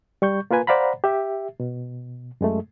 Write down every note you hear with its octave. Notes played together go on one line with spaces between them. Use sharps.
G3 C#6 G6
A#3 F4 A#4 B4 G#5
C5 D5 F5 F#5 A#5 B5
G4 E5
B2
F#2 G#3 A3